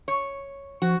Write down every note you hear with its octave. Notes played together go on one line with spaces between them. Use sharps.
C#5
F3 F#4